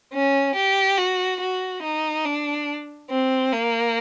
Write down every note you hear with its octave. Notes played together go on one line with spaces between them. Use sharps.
C#4
G4
F#4
F#4
D#4
D4
C4
A#3